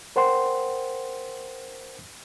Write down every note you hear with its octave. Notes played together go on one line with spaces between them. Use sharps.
A#4 C5 F#5 G5 C6